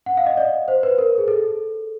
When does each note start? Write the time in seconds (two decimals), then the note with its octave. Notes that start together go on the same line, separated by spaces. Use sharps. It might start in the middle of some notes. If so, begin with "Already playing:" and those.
0.06 F#5
0.17 F5
0.27 D#5
0.37 D5
0.68 C5
0.83 B4
0.98 A#4
1.18 G#4
1.28 A4